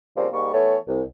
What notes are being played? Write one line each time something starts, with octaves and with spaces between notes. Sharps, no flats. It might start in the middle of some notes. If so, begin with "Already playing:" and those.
C#3 F3 G3 A#3 C4 D4
G#2 G3 A#3 C#6
E3 A3 B3 C#5
C2